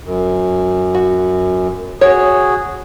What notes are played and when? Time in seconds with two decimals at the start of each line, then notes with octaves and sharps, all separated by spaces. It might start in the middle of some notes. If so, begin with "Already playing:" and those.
0.03 F#2
0.95 F#4
2.01 F#4 G#4 C#5